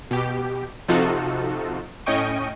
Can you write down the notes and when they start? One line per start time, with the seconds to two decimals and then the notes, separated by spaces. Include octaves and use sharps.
0.11 B2 G4
0.88 C3 F3 D#4 F4 F#4 A4
2.06 A2 C#4 D#5 G5 C#6 D#7